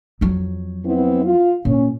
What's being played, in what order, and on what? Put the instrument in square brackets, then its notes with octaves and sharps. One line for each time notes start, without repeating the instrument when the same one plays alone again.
[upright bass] F2 F#3
[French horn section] B3 C4 E4
F4
[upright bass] A#2 [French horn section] C#4